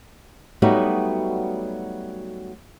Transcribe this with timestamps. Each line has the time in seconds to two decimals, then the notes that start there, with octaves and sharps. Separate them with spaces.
0.62 F#3 G3 A3 B3 D#4 F#4